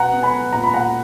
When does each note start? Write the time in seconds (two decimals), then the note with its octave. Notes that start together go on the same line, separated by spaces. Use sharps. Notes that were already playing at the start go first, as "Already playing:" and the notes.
Already playing: B2 B3 F#5 A#5
0.13 B3
0.23 G#5 B5
0.33 B3
0.53 A#2 A#5
0.64 B5
0.73 A#2 F#5 A#5